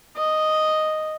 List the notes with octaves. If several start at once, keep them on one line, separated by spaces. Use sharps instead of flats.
D#5